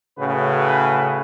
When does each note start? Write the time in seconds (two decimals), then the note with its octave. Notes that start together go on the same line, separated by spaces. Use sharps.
0.18 A2 C#3 F#4 B4